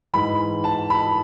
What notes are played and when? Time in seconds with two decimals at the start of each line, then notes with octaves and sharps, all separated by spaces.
0.13 G#2 E3 B5
0.64 A5
0.90 B5